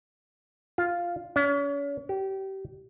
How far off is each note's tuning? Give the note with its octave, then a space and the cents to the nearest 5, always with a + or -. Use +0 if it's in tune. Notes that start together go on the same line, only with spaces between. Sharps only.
F4 +0
C#4 +35
G4 -25